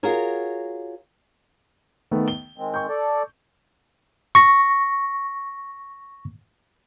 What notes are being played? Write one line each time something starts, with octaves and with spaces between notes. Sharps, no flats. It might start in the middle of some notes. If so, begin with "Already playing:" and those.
F4 F#4 G#4 A#4 C#5
D#3 A3 B3
G7
D#3 G#3 C4
C#6 G6
A4 D5
C#6 A#6